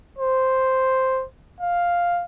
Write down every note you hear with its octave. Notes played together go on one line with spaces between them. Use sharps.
C5
F5